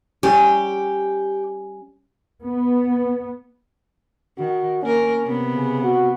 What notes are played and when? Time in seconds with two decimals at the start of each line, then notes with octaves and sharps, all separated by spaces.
0.23 G3 C#4 G4
2.42 B3
4.38 D#3 F#4
4.83 A#3 C#4 A#4
5.24 C3 B3
5.54 C#3
5.84 F#4